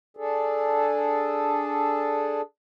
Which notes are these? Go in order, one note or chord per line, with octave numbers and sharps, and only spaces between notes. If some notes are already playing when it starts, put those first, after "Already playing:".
D4 G#4 A4